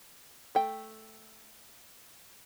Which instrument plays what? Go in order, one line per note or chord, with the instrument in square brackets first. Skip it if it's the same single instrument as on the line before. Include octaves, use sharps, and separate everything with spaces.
[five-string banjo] A3 G5